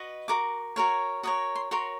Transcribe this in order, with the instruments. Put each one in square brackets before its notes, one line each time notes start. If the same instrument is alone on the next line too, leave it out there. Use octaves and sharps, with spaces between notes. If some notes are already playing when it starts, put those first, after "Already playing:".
Already playing: [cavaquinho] F#4 B4 D#5
F#4 A#4 D6
F#4 A#4 C#5
F#4 A#4 C#5 D#6
C6
F#4 A#4 C#5 C6